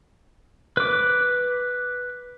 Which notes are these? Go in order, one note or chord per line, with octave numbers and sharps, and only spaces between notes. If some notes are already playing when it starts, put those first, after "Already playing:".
B4 D6